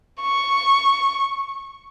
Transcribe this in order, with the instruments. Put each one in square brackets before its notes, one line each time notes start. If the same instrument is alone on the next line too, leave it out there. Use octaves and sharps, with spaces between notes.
[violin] C#6